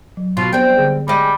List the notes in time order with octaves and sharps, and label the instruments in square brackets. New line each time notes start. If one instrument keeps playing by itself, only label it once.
[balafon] F#3
[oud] B2 [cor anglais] F4
[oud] G3 C4 [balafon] B3 D4 [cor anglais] G5
[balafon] D3 G#4
[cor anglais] G3 [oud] G#3 D#5